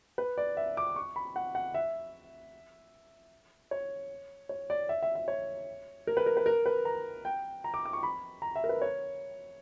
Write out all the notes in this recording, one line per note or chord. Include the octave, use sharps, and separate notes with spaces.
B4
D5
E5
D6
C#6
B5
F#5
F#5
E5
C#5
C#5
D5
E5
E5
E5
C#5
A#4
B4
A#4
B4
A#4
B4
A#5
G5
A#5
D6
D6
C#6
B5
A#5
E5
A#4
B4
C#5